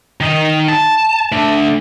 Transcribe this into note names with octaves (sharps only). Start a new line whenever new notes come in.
D#3 D#4
A5
A3 D4